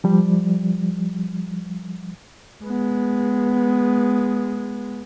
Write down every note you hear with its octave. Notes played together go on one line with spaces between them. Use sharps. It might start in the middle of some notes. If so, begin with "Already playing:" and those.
F3 G3
G#3 B3